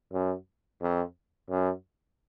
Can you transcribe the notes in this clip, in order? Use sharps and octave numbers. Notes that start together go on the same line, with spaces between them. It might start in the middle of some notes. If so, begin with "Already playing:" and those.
F#2
F2
F#2